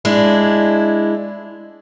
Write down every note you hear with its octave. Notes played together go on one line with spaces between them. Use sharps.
G#3 D4 E4